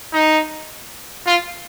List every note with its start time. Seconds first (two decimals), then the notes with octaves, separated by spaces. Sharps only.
0.13 D#4
1.27 F4